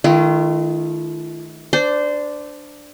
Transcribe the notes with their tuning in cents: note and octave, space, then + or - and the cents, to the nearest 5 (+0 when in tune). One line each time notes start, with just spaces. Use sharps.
D#3 +0 A3 -30 F4 -40
D4 +0 C5 -20